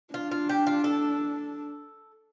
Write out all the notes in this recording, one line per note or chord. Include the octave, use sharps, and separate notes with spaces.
D4 F4
F4
G4
F4
A4